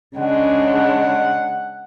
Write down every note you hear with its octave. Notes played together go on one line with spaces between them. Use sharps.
C#3 G#3 D4 F#5